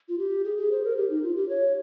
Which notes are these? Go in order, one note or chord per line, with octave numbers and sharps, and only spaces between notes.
F4
G4
G#4
G#4
C5
A#4
G4
D#4
F4
G4
C#5